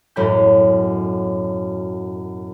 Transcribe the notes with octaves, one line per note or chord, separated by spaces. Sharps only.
E1 F#2 A2 A#5 B5 G6